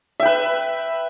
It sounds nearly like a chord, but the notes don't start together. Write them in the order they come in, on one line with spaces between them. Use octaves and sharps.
E5 G5 B4